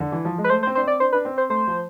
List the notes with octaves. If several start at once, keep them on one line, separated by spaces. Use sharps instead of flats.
D3
E3
F3
G#3
B4
A3 C5
C5
C4
D4 C5
C4 D5
D4 C5
D4 B4
C4
C5
A3 C5
F3